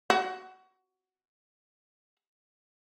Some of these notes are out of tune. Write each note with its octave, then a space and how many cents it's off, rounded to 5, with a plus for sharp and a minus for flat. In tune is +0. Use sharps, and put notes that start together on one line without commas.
F#4 +20 F#5 +5